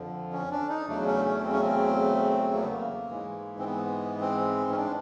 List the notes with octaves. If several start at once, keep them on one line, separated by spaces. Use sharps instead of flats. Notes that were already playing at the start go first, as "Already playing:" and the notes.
Already playing: F2 D3 F3
C#4
D4
D#4
E2 C#3 F#3 A3 D4
C#4
C#4
C4
C#4
C4
A#3
B3
A#3
G#2 E3 G#3
C4
B3
C4
C#4
D4